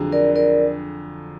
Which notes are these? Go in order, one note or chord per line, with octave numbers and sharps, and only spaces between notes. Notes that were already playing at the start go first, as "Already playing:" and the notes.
Already playing: F2 D3 F#3 G#4
A#4 D5
A#4 D5